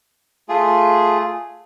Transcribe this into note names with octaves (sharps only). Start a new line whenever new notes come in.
A3 F4 G#4